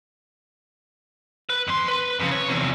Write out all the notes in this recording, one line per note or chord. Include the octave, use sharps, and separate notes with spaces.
B4
F2 C6
B4
F2 C#3
C#5
E2 C3